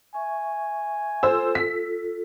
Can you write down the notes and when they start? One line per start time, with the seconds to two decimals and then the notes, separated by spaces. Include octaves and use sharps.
0.14 E5 G#5 C#6
1.23 F4 A4 C5 E6
1.55 B6